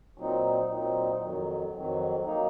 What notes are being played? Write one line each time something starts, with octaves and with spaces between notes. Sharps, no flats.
A#2 F#3 C4 D#4
A#2 F#3 C4 D#4
F2 D#3 F#3
F2 D#3 F#3
F#3 A#3 D#4